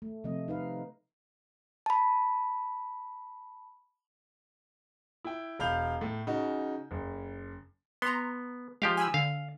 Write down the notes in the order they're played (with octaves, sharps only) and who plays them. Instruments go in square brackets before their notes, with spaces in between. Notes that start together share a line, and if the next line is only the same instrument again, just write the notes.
[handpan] A3
C3 F3 A3 C4 D#5
D#4 B4 F5
[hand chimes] A5 B5
[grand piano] E4 G5
E1 F5 B5 G6 F7
A2
C#3 D#4 F#4
F#1
[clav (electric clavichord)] B3 [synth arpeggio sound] A#5 C6
[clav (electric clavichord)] F3 G4 F5 [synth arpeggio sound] G#3
[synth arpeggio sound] G#5 B5 E6
[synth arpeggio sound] D3 [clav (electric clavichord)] F5